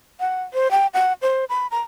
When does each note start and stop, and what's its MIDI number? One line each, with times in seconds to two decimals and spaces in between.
0.20 0.42 78
0.54 0.71 72
0.71 0.87 79
0.94 1.13 78
1.22 1.45 72
1.49 1.67 83
1.71 1.80 82